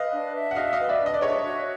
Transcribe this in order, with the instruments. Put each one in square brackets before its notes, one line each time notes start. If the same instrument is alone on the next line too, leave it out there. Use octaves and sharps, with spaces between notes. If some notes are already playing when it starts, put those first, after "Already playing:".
Already playing: [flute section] B4 [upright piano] D#5 F5
[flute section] D4
E5
[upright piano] F#5
[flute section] F#4 [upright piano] D#5 F5
[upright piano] D#5 F5
[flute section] B4
[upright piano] D5 E5
[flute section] D4
[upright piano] D#5
D5
[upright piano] C#5 D#5 [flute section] E5
[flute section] F#4